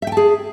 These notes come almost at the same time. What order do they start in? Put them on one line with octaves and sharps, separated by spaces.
E5 G5 A5 G#4